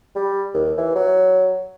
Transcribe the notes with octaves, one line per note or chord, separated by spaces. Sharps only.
G3
D#2
E3
F#3